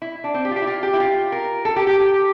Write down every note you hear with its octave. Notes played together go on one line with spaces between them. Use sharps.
E4
D4
C4
G4
F4
G4
E4
F4
G4
E4
F4
A#4
A4
G4
G4